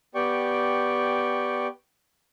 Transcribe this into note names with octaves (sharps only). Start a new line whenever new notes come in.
B3 G4 D5 G5 C#6